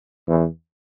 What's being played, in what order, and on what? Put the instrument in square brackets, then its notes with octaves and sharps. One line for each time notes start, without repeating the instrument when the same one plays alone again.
[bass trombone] E2